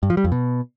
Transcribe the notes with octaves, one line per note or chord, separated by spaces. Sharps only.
G2
F3
G3
F2
B2